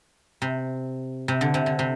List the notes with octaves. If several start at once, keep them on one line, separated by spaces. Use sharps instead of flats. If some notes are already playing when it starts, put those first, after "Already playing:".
C3
C3
D3
C3
D3
C3